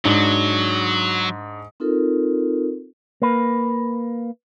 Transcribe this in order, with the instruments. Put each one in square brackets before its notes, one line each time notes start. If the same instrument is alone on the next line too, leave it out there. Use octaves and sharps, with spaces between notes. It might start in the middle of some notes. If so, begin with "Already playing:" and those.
[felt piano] G#2 D4 [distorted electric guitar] F#3
[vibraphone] C4 D#4 F4 A4 A#4
[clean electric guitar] A#3 B4